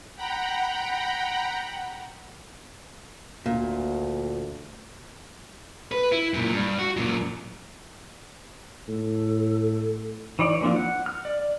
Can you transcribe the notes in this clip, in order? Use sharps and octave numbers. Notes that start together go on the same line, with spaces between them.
F#5 G5 A#5 B5
D2 A#2
B4
E4
F#2 A#2
G2
F#4
F#2 A#2
A2 A4
E3 C#5 D5
F3 A#3 C4 D4 F4
F#5
F6
D5